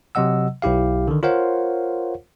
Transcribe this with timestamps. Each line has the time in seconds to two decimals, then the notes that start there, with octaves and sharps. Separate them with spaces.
0.15 C3 F#3 D#5 F#5 E6
0.62 B1 E4 G4 F5
1.08 D3 D#3
1.23 F4 A#4 C5 C#5 F5 F#5